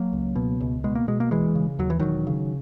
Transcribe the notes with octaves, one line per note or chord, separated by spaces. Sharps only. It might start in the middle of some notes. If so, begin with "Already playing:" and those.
Already playing: F#3 A#3
C#2
B2
C#2
B2 G#3
A#3
B2 G#3
A#3
E1 E3 G#3
C#3
D#2 F#3
E3
E1 D#3 F#3
C#3